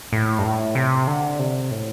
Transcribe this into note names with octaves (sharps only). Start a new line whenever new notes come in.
A2
G2
A2
C3
D3
C3
A2